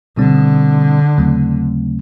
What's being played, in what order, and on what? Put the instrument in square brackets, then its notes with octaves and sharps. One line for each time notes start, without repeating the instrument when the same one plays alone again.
[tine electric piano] B2 G3 C4 [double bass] D3
[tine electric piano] D#2 C#3 F#3 A3 C4